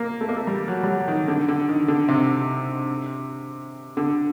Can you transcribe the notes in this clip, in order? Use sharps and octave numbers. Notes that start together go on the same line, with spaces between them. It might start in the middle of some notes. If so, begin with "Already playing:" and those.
Already playing: A#3
A3
A#3
A3
G3
F#3
G3
F#3
D#3
D3
D3
D#3
D3
C3
D3